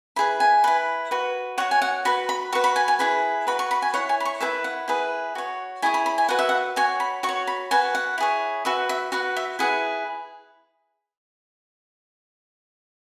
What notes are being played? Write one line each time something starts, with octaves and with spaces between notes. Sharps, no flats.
E4 G#4 B4 B5
G#5
E4 B4
F#4 B4
F#4 C#5 F#5
G#5
F#5
F#4 B4 B5
B5
F#4 B4 C#6
B5
G#5
G#5
E4 G#4 B4 B5
F#4 B4 B5
C#6
B5
G#5
E4 C#5 F#5
G#5
B5
C#6
E4 G#4 B4 E5
F#5
E4 G#4 B4
F#4 C#5
E4 G#4 C#5 G#5
B5
B5
G#5
F#4 B4 F#5
E5
F#5
F#4 C#5 G#5
B5
F#4 C#6
C#5
B5
F#4 B4 G#5
F#5
E4 G#4 C#5
F#4 B4 E5
E5
F#4 B4 F#5
E5
E4 G#4 B4 F#5